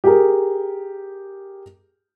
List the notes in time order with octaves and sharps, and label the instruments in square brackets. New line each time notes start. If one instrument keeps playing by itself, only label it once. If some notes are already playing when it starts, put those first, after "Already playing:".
[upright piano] G4 G#4 A#4